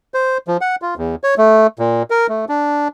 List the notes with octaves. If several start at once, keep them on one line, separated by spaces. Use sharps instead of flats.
C5
F3
F#5
F4
E2
C#5
A3
A#2
A#4
A3
D4